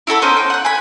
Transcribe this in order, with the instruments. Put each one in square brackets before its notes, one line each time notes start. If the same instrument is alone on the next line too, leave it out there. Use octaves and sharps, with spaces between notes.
[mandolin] E4 F#4 A4 B5
B3 C#4 D#4 C5
G5
F#5 F#6
G#5 B5